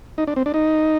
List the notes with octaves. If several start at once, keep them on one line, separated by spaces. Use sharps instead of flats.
D#4
D4
C4
D4
D#4